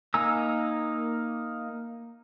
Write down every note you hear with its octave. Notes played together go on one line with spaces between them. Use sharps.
A#3 D#4 G#5 A#5 E6